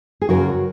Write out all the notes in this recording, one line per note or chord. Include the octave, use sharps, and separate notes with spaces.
G#4
F#2 C#3 F#3 F#4 A#4